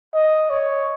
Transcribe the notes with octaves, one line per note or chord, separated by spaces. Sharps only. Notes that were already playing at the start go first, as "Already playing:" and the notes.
D#5
C#5